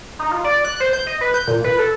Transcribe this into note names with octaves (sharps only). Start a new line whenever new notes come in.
D#4
F4
D5
F#6
C5
G6
D#5
B4
G6
A#2
B4
A4